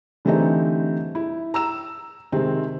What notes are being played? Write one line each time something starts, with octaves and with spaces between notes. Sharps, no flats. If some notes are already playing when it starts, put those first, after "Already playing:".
D3 E3 G3 A3 C4 D#4
E4
A#5 E6 E7
C3 D#3 G#3 C4